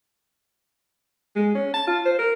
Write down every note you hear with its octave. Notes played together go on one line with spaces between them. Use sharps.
G#3
C#4
A5
F4
C5
A#4